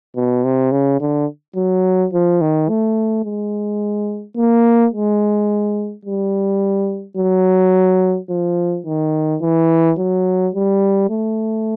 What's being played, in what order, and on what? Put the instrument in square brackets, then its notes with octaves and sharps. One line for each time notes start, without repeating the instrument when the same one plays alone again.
[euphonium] B2
C3
C#3
D3
F#3
F3
D#3
A3
G#3
A#3
G#3
G3
F#3
F3
D#3
E3
F#3
G3
A3